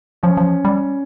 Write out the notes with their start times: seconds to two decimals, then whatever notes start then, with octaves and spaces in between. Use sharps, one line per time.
0.23 F3 C#4
0.37 F3
0.65 G3